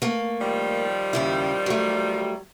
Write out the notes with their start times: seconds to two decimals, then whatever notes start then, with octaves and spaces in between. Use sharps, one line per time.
0.02 A3 A#3
0.41 D#3 F3 G3
1.13 D#2 C#3 E4
1.66 F#3 A3